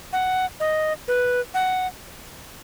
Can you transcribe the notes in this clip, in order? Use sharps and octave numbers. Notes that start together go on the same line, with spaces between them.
F#5
D#5
B4
F#5